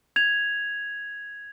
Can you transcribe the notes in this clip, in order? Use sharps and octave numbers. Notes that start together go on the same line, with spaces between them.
G#6 F7